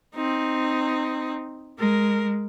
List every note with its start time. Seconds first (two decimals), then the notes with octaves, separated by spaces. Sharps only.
0.15 C4 D#4
1.79 G#3 A#4